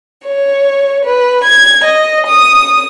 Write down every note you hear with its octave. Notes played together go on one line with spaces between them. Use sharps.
C#5
B4
G#6
D#5
D#6